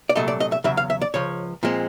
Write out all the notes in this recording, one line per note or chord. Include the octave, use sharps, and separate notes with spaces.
D5
C2 A#2 F#3 A3 D#5
D5
D#5
E5
E2 C#3 F#3 E5
F5
E5
D5
C#2 C#3 F3 C#5
A#2 F3 G#3 C4